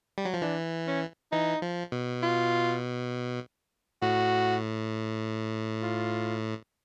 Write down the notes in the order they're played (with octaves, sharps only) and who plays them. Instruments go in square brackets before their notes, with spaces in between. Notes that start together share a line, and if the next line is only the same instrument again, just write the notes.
[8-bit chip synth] G3
F#3
F3
[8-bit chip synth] E3 [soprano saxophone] D4
[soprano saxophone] C#4
[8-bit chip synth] E3 [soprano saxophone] D#4
[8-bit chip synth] F3
B2
[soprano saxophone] F4
[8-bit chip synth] A2 [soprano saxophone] F#4
[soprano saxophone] F4